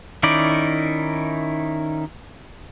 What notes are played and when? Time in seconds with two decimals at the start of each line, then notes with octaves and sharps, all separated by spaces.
0.23 D#3 C#4 D#4 E4 D5